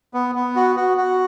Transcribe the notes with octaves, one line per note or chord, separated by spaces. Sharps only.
B3
B3
F#4
F#4
F#4